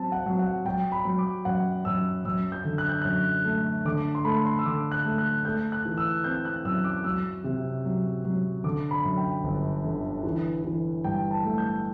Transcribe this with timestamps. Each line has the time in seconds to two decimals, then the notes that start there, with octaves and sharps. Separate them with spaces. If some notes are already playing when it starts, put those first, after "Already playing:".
Already playing: F#3 C4 A5
0.12 F#5
0.26 F#3
0.39 F#5
0.65 F#3 G5
0.92 B5
1.05 F#3
1.18 D6
1.45 F#2 F#5
1.85 F#2 E6
2.25 F#2 E6
2.52 G6
2.65 D3
2.78 F#6
2.89 G6
3.02 F#2 F#6
3.45 A3
3.85 D3 D6
4.15 C6
4.25 A3 B5
4.45 C6
4.59 E6
4.65 D3 D6
4.92 F#6
5.05 A3
5.18 F#6
5.45 A3 G6
5.72 F#6
5.85 E3
5.98 E6
6.24 C4 G6
6.45 F#6
6.65 F#2 E6
6.84 D6
7.04 F#3 E6
7.44 C3
7.85 F#3
8.25 F#3
8.64 D3 D6
8.91 B5
9.04 F#2
9.17 G5
9.44 G1
9.84 D3
10.24 E3
10.64 E3
11.04 G2 G5
11.31 A5
11.44 A3
11.58 G6